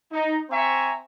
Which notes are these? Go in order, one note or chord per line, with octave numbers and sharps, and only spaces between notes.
D#4
C4 C5 E5 G#5 A#5 C#6